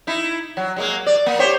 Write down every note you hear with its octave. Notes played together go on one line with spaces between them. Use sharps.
D#4 E4
F#3
F#3 G#3 A#3
D5
A#3
G4 C5 C#5